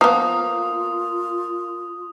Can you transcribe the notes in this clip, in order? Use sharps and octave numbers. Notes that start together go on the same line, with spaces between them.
F3 A#3 B3 F4 D#6